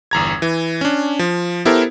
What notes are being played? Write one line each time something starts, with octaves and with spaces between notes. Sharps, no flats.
G1 E2 A#5 G#6
E3
C#4 D4
F3
B3 E4 G4 A4 A#4 C5